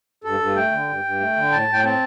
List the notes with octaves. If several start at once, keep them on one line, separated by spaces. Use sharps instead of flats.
G2 A4
G2
A3 G5
D3
G2
G2
A3
D3
A2 A5
A2 G5
C4 A5